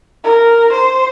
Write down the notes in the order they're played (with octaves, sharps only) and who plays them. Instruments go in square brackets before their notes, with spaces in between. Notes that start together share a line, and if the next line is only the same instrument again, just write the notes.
[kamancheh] A#4
C5